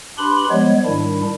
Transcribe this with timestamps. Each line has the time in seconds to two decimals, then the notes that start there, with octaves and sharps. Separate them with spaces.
0.18 D4 G4 B4 B5 C6
0.50 F3 G3 G#3 B3 C#5
0.85 G#2 D#3 G3 D4 E4